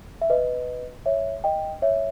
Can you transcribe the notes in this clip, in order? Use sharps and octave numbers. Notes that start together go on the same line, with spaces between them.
E5
B4 D#5
C#5 E5
D#5 G5
C#5 E5